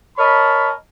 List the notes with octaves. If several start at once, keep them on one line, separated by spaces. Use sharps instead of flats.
A#4 C#5 D#5 A5 B5